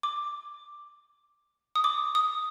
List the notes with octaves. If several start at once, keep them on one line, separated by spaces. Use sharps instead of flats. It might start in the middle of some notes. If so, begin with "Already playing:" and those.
D6
D#6
D6
D#6